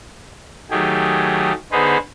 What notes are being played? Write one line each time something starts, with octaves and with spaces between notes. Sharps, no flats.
D#3 F#3 A3 G4 G#4
D3 B3 D#4 G#4 B4 C5